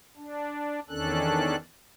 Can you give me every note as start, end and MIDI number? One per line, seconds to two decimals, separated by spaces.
0.17 0.80 62
0.89 1.56 40
0.89 1.56 51
0.89 1.56 61
0.89 1.56 62
0.89 1.56 69
0.89 1.56 90